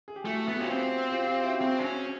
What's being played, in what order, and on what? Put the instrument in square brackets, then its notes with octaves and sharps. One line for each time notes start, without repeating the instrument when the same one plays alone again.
[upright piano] G#4
G4
[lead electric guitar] A3 [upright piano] E4 F#4
[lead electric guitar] B3
[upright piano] F#4
[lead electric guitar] C#4 [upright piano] F4 G4
[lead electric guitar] C4
[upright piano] F4 G4
F4 G4
E4 F#4
[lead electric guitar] C4 [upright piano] F#4 G#4
[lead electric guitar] D4
C#4